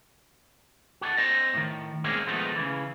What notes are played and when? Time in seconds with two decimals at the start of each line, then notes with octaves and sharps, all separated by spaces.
1.01 F#4 G#4 A4
1.17 C4 C5 D#5
1.54 A2 D#3
2.04 G#3 A#3 C4 C#4 D#4 G#4
2.27 D#3 F3 G#3 A3 B3 D#4
2.56 C#3 E3